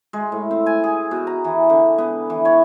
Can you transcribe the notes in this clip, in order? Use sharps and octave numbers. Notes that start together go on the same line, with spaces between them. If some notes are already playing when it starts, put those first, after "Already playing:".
G#3
A2
C4
G#5
G#4
B2
A#5
E3
D3
B3
E3
C#5